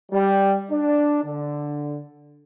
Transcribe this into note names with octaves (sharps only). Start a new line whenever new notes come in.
G3
D4
D3